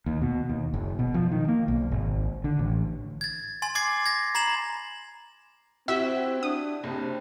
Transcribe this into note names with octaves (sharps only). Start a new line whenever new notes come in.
D#2
B2
D#2
F#1
B2
F3
D#3
A#3
B1
G#1
D3
A1
G#6 A6
G#5 C6 A6
C6 D6 G#6 A6 C7
G#6 A#6
A#5 B5 G#6 C7 E7 F#7
C4 E4 F#4 G4 E5
D4 D#6
F#1 C3